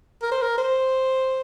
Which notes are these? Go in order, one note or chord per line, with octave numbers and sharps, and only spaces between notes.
A#4
C5
A#4
C5